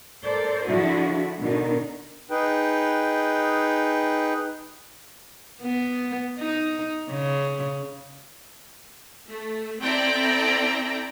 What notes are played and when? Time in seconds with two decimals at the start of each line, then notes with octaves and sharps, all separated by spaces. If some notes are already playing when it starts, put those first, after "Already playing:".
0.23 A4 A#4 C5 D5
0.66 D3 F3 D4 E4 F#4 G#4
1.39 B2 D3 D#3 D#4 A#4
2.31 D#4 G#4 B4 G5
5.61 B3
6.39 D#4
7.10 C#3
9.26 A3
9.81 C4 E4 A4 D5 G5 A#5